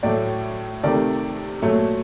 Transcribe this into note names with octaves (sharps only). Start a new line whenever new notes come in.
A2 F#3 A3 D5
C3 D#3 A3 D5
A#2 F#3 A3